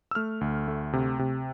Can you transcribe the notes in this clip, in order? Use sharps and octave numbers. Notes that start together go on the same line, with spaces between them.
E6
A3 F6
D2
A3
C3
C3